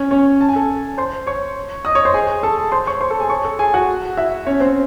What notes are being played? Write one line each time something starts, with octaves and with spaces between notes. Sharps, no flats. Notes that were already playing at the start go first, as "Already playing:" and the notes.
Already playing: C#4 C#5
C#4 C#5
A5
G#5
A4 A5
C5 C6
C#5 C#6
D#5 D#6
C#5 C#6
C5 C6
G#4 G#5
A4 A5
C5 C6
C#5 C#6
C5 C6
A4 A5
G#4 G#5
C#5 C#6
A4 A5
G#4 G#5
F#4 F#5
E4 E5
C#4 C#5
C4 C5